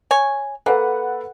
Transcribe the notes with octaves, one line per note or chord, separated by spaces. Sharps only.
C#5 G#5
A#3 A4 B4 F#5